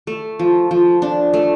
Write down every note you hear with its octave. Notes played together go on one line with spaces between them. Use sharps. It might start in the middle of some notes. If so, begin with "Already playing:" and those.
A3
F3
F3
D4
A3